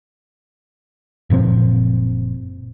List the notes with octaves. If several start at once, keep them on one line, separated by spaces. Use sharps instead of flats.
F#1 A#2 F3 C4